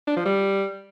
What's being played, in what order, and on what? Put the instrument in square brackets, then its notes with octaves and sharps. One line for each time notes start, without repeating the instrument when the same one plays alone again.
[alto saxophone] D4
F3
G3